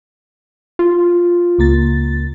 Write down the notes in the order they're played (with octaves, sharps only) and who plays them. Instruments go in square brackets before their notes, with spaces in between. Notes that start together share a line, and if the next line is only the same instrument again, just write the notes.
[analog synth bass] F4
[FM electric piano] C#2 A#3 A6